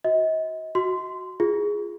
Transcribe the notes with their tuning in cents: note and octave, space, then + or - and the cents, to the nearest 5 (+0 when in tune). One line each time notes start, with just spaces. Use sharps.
F#4 +0 D#5 +40
F#4 +0 C6 -15
F4 -15 G#4 -5